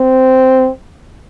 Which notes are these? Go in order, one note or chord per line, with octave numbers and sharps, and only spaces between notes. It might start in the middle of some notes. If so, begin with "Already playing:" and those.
Already playing: C4